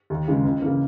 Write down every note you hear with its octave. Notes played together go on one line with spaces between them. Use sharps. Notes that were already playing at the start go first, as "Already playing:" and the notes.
D#2
C#3 E3 G#3
C#2
C#3 E3 A#3